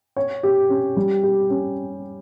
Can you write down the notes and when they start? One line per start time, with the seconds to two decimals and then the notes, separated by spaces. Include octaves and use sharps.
0.17 C#5
0.43 G4
0.69 C#4
0.97 G3
1.24 G4
1.50 C#4